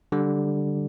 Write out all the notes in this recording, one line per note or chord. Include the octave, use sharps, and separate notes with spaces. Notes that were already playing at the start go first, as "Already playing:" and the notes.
D3 G3